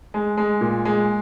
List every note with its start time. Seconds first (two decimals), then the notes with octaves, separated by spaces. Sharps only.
0.14 G#3
0.37 G#3
0.61 A#2
0.85 G#3